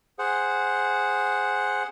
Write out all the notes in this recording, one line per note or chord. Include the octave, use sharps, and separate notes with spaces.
G#4 C5 F#5